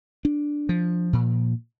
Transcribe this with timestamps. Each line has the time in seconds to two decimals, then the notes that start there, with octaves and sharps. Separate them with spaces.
0.25 D4
0.69 F3
1.13 A#2